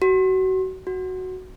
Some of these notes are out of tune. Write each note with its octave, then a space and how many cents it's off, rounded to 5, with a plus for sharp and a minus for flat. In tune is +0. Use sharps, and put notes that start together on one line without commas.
F#4 +30
F#4 +5